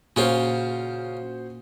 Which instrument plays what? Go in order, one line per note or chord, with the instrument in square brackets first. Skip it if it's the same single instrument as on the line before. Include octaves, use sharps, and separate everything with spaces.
[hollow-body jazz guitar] A#2 [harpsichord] C#3 C#4 F4 [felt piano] F#4 C5